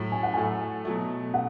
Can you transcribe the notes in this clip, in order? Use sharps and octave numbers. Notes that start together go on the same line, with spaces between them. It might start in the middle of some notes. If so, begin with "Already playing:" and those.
Already playing: A2 F#3 A3
G#5
F#5
A2 F#3 A3 G#5
B2 F#3 A3
F#5